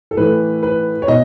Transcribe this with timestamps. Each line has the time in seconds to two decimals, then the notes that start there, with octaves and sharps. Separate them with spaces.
0.11 A4
0.17 A2 E3 B4
0.63 B4
1.02 C#5
1.08 B2 D#5